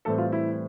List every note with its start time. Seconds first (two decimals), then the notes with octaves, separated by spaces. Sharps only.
0.05 A2 E3 G3 C4 A4
0.18 F4
0.32 E4